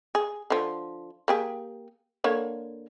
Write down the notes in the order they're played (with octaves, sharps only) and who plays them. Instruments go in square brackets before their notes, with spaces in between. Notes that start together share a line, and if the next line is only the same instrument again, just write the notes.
[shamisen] G#4
D3 F3
A#3 G4 G#4
D3 A#3 C#5